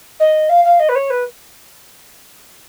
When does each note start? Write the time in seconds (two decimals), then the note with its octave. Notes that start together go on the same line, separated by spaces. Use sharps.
0.19 D#5
0.49 F5
0.64 F5
0.79 D#5
0.88 B4
0.95 C#5
1.10 B4